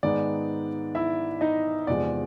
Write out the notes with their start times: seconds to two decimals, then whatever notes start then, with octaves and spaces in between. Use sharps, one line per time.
0.03 G#2 D#3 G#3 B3 D#4 D5
0.95 E4 E5
1.41 D#4 D#5
1.87 E2 C3 F3 G#3 D5